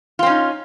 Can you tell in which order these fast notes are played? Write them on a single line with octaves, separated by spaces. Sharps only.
F4 C4 C#4 D#4